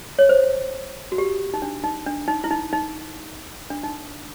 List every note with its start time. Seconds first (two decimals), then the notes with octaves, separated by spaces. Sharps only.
0.19 C#5
0.29 C5
1.12 F#4
1.18 G4
1.54 D#4
1.62 D4
1.84 D#4
2.06 D4
2.28 D#4
2.44 E4
2.51 D#4
2.73 D#4
3.70 D4
3.83 D#4